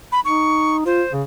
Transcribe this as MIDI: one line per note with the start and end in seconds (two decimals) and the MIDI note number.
0.12 0.20 83
0.25 0.82 63
0.25 0.77 85
0.86 1.03 65
0.86 1.12 72
1.13 1.23 49